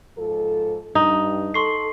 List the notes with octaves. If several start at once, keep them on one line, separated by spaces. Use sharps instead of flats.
G#2 F3 A4
G2 D#4
A4 C6 C#6 C7